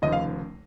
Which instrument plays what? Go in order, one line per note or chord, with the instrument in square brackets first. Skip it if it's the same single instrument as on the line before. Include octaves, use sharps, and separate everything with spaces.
[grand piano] F1 D#2 C#3 F3 D#5
F5